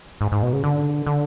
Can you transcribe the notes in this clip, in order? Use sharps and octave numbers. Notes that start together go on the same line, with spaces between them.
G#2
G#2
B2
C#3
D3
D3